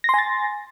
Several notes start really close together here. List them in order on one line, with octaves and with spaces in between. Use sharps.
A#6 C6 G#5 A6